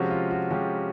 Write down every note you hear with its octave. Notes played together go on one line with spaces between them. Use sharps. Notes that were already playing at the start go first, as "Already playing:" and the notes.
Already playing: C3 F3 G#3 C#4 F#4
F4
F#4
C3 F3 G#3 C#4 G4